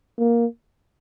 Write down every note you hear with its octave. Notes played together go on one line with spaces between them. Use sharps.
A#3